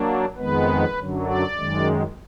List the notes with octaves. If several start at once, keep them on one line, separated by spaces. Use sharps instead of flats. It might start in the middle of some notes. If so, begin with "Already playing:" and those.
Already playing: F#3 A#3 D4
F2 D#3 G#3 B3 B4
F#2 D3 F#3
D5
F#2 D#3 G#3